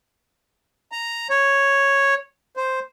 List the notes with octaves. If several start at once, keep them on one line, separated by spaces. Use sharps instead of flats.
A#5
C#5
C5